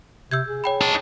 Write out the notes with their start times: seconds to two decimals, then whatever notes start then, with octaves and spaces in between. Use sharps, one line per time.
0.31 C3 E6 G6 G#6
0.47 G#4
0.64 C#5 G5 B5
0.81 D#4 A5